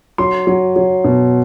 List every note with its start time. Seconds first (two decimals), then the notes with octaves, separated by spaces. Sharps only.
0.18 F#3 C6
0.47 F#3
0.76 F#3
1.04 B2